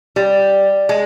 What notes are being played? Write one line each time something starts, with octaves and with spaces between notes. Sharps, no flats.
G3
G#3